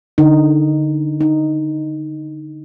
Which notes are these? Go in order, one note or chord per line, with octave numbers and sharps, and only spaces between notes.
D3 D#4
D#4